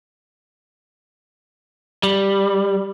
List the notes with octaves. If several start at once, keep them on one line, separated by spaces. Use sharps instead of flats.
G3